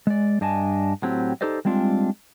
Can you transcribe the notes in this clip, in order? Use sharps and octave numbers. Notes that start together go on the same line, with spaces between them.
G#3 D5
G2 D4 D#5 G#5 A5
A2 F#3 C4 G4
D#4 G4 A4 C5 D5 D#5
G3 G#3 C4 D4 F4